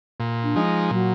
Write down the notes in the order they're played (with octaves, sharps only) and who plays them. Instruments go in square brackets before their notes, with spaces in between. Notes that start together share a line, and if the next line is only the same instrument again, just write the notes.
[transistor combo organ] A#2
[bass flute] D4
[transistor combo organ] F3 G#3 D#4
[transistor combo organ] A#2 [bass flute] F#3